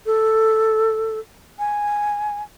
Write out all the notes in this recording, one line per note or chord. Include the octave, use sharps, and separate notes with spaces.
A4
G#5